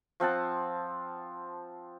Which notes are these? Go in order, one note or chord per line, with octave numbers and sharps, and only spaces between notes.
F3 C4 F#5 A5